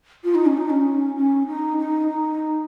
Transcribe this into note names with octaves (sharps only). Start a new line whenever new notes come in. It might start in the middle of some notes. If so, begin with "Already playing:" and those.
F4
D#4
C#4
D#4
C#4
C#4
D#4
D#4
D#4